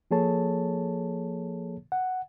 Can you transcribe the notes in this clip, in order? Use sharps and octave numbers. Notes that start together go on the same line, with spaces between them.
F3 A#3 G#4 A4 C#5 A5
F#5